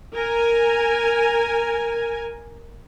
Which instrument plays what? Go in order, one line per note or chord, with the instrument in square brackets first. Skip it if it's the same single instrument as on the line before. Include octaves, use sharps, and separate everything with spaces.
[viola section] A#4 G#5